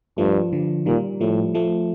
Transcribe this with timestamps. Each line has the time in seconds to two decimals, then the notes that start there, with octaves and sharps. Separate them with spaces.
0.18 G2 F3 A3
0.53 D3 F3
0.86 A#2 D#3 G3
1.21 A2 F3 A3
1.54 F3 A3